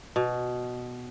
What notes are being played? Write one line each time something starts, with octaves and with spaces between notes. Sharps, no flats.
B2